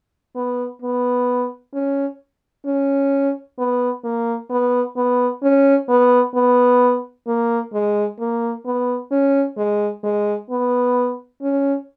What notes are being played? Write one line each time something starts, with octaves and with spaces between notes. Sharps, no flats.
B3
B3
C#4
C#4
B3
A#3
B3
B3
C#4
B3
B3
A#3
G#3
A#3
B3
C#4
G#3
G#3
B3
C#4